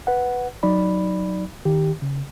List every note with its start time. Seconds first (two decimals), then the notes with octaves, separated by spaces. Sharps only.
0.07 B4 F#5
0.63 F#3 D#4 D5 B5
1.65 D#3 G4
2.02 C#3